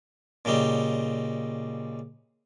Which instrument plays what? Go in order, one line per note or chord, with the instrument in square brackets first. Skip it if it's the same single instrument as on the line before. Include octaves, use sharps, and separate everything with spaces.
[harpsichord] A#2 C#3 G3 D#4